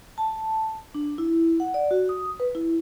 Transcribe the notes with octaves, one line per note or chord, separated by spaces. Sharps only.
A5
D4
E4
F#5
D5
F#4
D#6
B4
E4